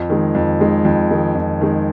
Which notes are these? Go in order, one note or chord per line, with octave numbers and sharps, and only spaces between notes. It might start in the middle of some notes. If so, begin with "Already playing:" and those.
Already playing: F2
D#3 G#3
F2
D#3 G#3
F2
D#3 G#3
F2
D#3 G#3